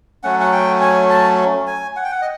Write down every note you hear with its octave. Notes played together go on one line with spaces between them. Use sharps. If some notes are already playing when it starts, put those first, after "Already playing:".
F#3 A3 C#4 F#5
F#5
G5
G#5
A5
G#5
F#5
G5
F#5
D#5